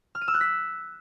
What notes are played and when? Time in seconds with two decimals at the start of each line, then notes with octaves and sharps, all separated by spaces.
0.15 F6
0.21 D#7
0.28 E6
0.34 F#6
0.41 B6